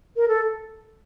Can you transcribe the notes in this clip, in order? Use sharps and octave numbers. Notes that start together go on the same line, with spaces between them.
A#4
A4